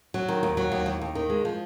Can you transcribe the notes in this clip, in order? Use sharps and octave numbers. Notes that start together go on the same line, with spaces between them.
F#3
D#3
D#2
F#3
D#2
D#2
D#2
D#3
G#3
F3